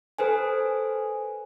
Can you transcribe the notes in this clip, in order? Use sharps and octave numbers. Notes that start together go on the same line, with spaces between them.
A4 B4 C5 G#5